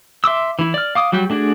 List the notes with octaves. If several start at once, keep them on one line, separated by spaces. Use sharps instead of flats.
E5 C6 D6 E6
E3 E4
D5 F6
F5 D6 D#6
F#3 G3 F#4 G4
A3 D4 F#4 G#4 D5